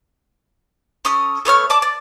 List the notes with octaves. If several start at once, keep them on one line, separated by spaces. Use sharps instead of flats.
C#4 A4 D#6 F6
A3 B3 C#5 F6
D5 A5 D6
D5